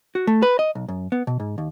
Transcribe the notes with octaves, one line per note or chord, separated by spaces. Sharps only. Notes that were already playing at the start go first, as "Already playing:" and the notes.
F#4
A3
B4
D#5
B1
F#2
B3
B2
G#2
D#2